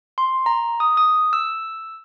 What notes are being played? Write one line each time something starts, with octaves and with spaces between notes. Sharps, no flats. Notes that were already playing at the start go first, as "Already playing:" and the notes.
C6
A#5
D#6
D#6
E6